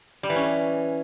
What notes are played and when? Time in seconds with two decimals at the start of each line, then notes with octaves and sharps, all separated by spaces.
0.23 G3
0.29 E3
0.35 C#4